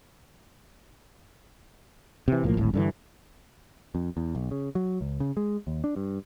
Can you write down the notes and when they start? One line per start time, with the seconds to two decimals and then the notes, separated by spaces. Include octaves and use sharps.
2.28 C3 E3
2.43 B1 A2 F3 A#3
2.57 D1 G#1 A2
2.74 G2 D3 E3
3.95 F2
4.17 E2
4.35 B1
4.51 C#3
4.75 F#3
5.01 C#2
5.20 C#3
5.37 G#3
5.67 D#2
5.84 D4
5.96 G2